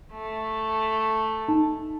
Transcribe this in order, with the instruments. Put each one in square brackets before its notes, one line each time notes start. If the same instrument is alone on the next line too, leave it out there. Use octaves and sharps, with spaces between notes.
[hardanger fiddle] A3
[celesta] D#4 A5